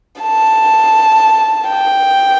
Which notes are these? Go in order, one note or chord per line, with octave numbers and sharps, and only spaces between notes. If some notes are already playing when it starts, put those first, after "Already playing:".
A5
G5